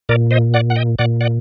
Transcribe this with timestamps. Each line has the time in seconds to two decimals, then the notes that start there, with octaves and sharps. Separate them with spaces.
0.09 A#2 A#4 D5
0.31 C5 D#5
0.54 D5 F#5
0.70 F#5
0.76 D#5 G5
0.99 A#2 D5 F#5
1.21 D5 F#5